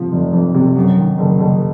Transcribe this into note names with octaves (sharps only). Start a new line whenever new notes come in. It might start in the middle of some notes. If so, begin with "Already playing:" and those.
Already playing: C3 F3
F1
F2
C3
F#2
D#3
F#1
F#1